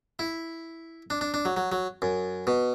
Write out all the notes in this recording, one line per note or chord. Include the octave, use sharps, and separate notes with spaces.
E4
D4
D4
D4
F#3
F#3
F#3
F#2
B2